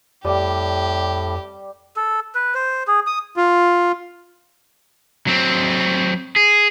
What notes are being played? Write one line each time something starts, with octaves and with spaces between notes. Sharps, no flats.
F2 A2 G3 G4
A4
B4
C5
G#4
D#6
F4
F#3 C4
G#4